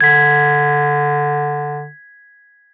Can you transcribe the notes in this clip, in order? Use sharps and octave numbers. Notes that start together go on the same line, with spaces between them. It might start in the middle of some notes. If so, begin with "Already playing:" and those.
D3 G#6 B6